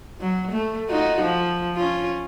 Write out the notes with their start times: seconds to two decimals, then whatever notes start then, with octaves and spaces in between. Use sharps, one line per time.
0.20 F#3
0.51 A3
0.88 D#4 F4 F#4
1.21 F3
1.76 C#4 F4